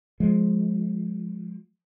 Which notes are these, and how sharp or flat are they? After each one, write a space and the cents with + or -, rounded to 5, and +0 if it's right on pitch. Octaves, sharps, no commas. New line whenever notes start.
F3 +20 G#3 +10